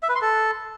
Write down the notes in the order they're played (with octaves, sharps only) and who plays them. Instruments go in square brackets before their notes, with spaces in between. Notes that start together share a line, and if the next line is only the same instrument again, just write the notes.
[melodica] E5
B4
C6
A4